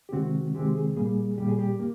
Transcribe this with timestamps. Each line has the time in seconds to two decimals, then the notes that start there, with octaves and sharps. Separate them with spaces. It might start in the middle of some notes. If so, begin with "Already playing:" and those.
0.09 G4
0.12 C3 D#3 G#3 C4 F#4
0.55 C3 D#3 G#3 C4 G4
0.75 G#4
0.96 A#2 G3 A#3 G#4
1.38 A#2 G3 A#3 G4
1.48 G#4
1.59 G4
1.79 A#3